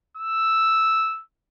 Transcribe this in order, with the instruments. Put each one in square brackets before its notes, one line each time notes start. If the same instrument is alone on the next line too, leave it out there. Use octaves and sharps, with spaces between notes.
[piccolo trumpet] E6